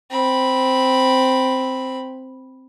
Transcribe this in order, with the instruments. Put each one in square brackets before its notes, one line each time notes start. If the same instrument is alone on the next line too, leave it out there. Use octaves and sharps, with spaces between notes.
[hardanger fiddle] C4 B5